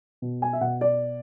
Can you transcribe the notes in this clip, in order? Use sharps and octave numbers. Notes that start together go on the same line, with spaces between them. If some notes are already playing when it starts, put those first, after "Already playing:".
B2
G#5
E5
B2 F#5
D5